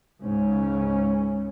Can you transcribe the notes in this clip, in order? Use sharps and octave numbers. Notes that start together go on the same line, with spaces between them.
C#2 G#2 C#3 C#4